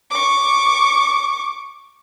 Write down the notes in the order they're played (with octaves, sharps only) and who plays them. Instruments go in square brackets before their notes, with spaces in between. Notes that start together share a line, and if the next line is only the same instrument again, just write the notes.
[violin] C#6 D6